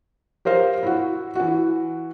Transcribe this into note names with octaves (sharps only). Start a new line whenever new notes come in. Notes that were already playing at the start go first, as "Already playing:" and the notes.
G4 A#4 C5 F5
E4 F#4
E3 F#4